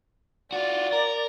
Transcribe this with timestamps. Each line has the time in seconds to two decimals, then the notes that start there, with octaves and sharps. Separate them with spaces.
0.52 F4 F#4 D5
0.93 A#4